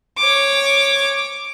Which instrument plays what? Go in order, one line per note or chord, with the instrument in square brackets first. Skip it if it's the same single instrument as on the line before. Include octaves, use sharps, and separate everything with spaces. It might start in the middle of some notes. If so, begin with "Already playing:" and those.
[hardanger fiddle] C#5 D6